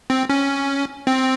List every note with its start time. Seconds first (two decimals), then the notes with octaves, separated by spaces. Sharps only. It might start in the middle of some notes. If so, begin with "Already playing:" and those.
0.10 C4
0.29 C#4
1.07 C4